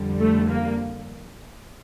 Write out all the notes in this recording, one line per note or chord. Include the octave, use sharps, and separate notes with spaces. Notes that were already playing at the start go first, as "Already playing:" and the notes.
Already playing: F2 D3 G3
A3
A#3